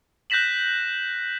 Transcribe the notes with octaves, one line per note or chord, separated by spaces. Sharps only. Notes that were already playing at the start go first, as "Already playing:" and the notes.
F#6 G6 A#6 B6 E7 F#7